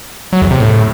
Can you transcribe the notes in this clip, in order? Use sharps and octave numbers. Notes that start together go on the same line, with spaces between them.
F#3
E2
C3
A2